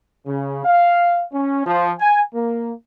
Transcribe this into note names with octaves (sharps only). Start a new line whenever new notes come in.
C#3
F5
C#4
F3
G#5
A#3